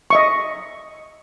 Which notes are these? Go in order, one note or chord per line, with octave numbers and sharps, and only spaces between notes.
D#5 E5 C#6